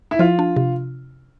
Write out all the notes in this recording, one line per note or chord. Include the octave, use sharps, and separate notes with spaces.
E4
F3 F4
D4
C3